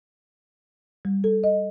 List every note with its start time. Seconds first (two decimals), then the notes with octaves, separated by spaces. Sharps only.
1.05 G3
1.24 A4
1.44 D#5